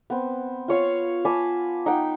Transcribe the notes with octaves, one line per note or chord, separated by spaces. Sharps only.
B3 C4
F4 C#5 F5
G#5 A5 B5 D6
D#4 F#5 G5